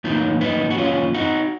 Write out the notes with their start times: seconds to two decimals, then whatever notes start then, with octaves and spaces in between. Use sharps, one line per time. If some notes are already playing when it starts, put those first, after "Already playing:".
0.04 F#2 D#3 A#3 B3 D#4
0.41 B3 D#4
0.70 F#4
0.78 C#4 F4
1.14 D#4 F#4